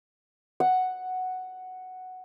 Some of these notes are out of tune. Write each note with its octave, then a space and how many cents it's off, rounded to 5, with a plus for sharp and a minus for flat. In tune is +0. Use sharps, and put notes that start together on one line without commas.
F#5 +0